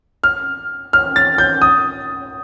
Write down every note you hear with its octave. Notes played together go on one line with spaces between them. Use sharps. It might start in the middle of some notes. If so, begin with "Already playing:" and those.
F6
F6
A6
G6
D#6